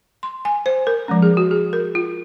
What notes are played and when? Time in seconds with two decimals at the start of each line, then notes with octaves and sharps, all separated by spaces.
0.23 C6
0.45 G#5
0.66 C5
0.87 A#4
1.08 F3 G#3 C#4
1.22 G#4
1.37 F#4
1.51 G#4
1.73 A#4
1.95 F4